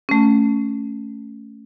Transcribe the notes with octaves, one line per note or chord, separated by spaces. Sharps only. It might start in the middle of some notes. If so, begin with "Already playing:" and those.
A3 C#4